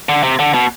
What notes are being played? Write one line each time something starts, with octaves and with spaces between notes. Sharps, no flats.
D3
C3
D3
B2